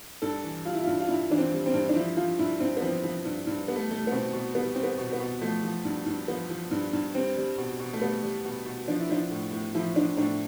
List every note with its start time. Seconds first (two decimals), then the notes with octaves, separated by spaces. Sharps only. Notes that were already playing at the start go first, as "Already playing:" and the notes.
0.22 G2 A4
0.44 E3
0.65 G3 F4
0.74 E4
0.83 G2 F4
1.00 F4
1.09 G2 E4
1.30 E3 D4
1.38 C4
1.52 G3
1.66 C4
1.74 G2
1.89 D4
1.95 F3 E4
2.17 F3 F4
2.39 G2 E4
2.60 G2 C4
2.77 B3
2.82 F3 C4
3.04 F3
3.25 G2
3.47 G2
3.68 G3 B3
3.76 A3
3.90 G3 A3
4.07 B3
4.12 B2 C4
4.33 B2
4.55 G3 B3
4.75 G3 C4
4.83 B3
4.98 B2
5.13 B3
5.20 B2
5.41 F3 A3
5.63 F3
5.85 G2
6.06 G2
6.28 F3 B3
6.50 F3
6.71 G2
6.93 G2
7.15 G3 C4
7.37 G3
7.58 B2
7.80 B2
7.93 A3
8.01 G3 B3
8.23 G3
8.45 B2
8.66 B2
8.88 F3 D4
9.00 E4
9.09 F3 D4
9.31 A2
9.52 A2
9.75 F3 E4
9.96 F3 D4
10.17 A2 D4